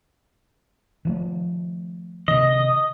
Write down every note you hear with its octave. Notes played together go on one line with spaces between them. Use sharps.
D#3 F3 A3
C3 D#3 D#5